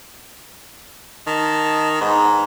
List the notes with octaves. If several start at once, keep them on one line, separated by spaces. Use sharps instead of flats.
D#3 D#5 A5
G#2 B3 D#4